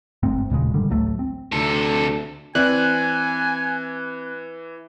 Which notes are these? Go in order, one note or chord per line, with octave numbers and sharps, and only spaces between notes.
G1 G#2 A3 C4
D#1 A#2 C#3 G#3
G2 D3 D#3 G3
A1 D2 F#3 A3
C4
D2 C3 A4
E3 C4 D5 G#5 F#6